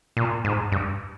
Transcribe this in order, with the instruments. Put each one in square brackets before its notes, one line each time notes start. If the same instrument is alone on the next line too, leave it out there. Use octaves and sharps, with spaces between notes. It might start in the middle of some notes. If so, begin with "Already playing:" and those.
[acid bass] A#2
G#2
G2